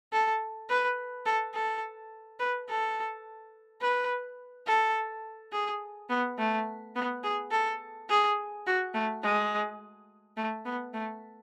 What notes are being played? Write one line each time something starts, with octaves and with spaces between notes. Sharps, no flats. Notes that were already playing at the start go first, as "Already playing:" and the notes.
A4
B4
A4
A4
B4
A4
B4
A4
G#4
B3
A3
B3
G#4
A4
G#4
F#4
A3
G#3
A3
B3
A3